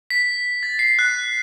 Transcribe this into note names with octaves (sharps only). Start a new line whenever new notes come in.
B6
A6
C7
F#6